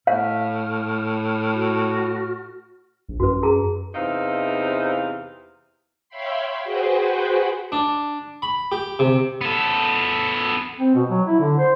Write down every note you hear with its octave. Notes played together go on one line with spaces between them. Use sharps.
A2 F5 F6
F#4
A#1
F#2 F#4 B4
G#4 A#5
E2 C3 E3 D#4 C5 F5
C#5 E5 F5 G5 B5 C6
F#4 G#4 B4 C5 F#5 G5
D4
B5
G4
C3
B3 A4
C4
B2
F#3
E4
D3
C5